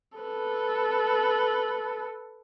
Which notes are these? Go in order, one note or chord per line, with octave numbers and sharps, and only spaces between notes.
A4 B4